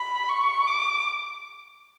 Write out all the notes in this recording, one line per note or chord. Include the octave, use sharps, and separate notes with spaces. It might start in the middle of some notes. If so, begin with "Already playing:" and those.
Already playing: B5
C#6
D6